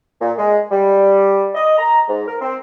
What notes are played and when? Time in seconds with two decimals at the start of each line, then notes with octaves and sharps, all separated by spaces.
0.21 A#2
0.38 G#3
0.71 G3
1.55 D#5
1.78 A#5
2.08 G#2
2.27 A#4
2.41 C4